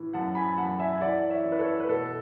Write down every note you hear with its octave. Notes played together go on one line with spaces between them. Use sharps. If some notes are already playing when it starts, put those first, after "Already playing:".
Already playing: A2 E3
F#2 F#5 A5
G#5 B5
F#2 F#5 A5
E5 G#5
G#5
E3 D5 F#5
C#5 E5
E3
B4
A4 C#5
B4
B2 A4